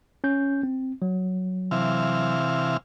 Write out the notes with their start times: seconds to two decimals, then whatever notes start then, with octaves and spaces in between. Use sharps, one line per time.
0.24 C#4 G6
0.63 C4
1.02 F#3
1.71 C3 E3 F5